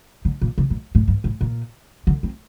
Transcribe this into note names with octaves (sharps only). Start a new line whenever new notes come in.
D3
A#2
C3
A#2
A2
G2
A2
A#2
D3
C4